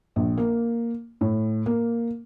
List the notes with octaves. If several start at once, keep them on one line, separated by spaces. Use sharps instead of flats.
A#1
A#3
A2
A#3